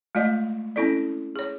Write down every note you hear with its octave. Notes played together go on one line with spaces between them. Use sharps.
G#3 A3 F4 D5 D#5
C4 C#4 E4 A4 D5
G#4 C#5